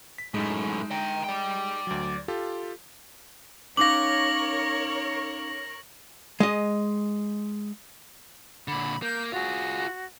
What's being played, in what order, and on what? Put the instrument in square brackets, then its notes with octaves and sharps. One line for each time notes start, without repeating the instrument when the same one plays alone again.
[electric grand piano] B6
[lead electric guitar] F#2 A2 [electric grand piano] G#3 D#4
[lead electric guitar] G5 A#5
D5 G5
[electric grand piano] D2 F#3
F4 G4 A4
[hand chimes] C#4 D#4 F5 [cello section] A#4 C#5 [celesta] D6 [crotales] A#6 F#7
[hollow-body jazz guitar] G#3 D#5
[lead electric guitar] A#2 D3 [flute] B5
[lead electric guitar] A#3 [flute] G6
[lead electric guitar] F4 G#4 [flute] F#4